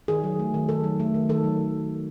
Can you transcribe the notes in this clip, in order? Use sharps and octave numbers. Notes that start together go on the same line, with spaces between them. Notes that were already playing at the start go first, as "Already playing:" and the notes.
D#3 G#4
F#3
A3
D#3
D#3 A4
F#3
A3
D#3
D#3 A4
F#3